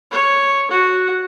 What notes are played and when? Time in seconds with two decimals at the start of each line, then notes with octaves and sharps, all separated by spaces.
0.11 C#5
0.71 F#4